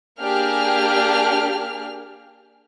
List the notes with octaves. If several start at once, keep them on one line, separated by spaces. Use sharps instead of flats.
A#3 D4 G4 G#4 F6